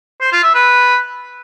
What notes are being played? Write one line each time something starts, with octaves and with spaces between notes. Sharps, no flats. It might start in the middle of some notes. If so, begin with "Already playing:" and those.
C5
F4
E5
B4